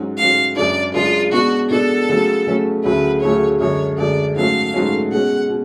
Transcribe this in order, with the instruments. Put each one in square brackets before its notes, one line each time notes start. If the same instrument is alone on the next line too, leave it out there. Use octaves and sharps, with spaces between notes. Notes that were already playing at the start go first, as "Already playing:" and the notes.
Already playing: [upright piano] G#2 F#3 C#4
[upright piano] G#2 F#3 C#4 [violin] F5
[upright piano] F#2 C#3 G#3 D4 [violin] D5
[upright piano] F#2 C#3 G#3 D4 [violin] F4
[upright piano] B2 G#3 B3 D4 [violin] F#4
[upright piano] B2 G#3 B3 D4 [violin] A4
[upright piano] C#3 F#3 A3 C#4
C#3 F#3 A3 C#4
[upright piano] D2 C#3 F#3 A3 C#4 [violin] B4
[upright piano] D2 C#3 F#3 A3 C#4 [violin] C#5
[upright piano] F#2 D3 G#3 [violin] C#5
[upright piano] F#2 D3 G#3 [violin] D5
[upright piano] G#2 F#3 A3 C#4 [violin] F5
[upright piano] G#2 F#3 A3 C#4
[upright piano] B2 G#3 C#4 [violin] F#5
[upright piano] B2